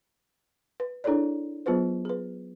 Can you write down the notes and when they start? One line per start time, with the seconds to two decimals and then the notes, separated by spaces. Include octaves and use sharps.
0.80 B4
1.04 D4 E4 G#4 A4 C#5 D5
1.66 F#3 B3 F4 G#4 B4 C5
2.05 G#4 B4